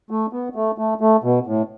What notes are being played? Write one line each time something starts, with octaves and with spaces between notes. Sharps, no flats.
A3
B3
A3
A3
A3
B2
A2